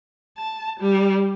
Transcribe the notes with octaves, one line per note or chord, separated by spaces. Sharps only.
A5
G3